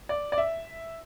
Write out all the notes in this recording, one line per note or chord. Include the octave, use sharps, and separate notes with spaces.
D5
D5
E5